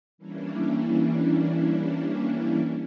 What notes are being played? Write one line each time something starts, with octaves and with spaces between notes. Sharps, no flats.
E3 G3 A#3 C#4 D4 E4